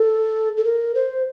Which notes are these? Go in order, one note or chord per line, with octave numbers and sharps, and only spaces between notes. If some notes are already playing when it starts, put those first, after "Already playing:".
Already playing: A4
A4
A#4
C5